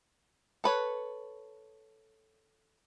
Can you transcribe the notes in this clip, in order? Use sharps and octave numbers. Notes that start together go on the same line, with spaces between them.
A4 B4 C#5